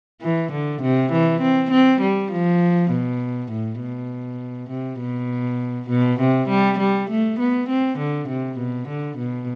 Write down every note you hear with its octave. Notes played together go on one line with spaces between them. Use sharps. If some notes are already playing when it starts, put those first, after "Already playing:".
E3
D3
C3
E3
C4
C4
G3
F3
B2
A2
B2
C3
B2
B2
C3
G3
G3
A3
B3
C4
D3
C3
B2
D3
B2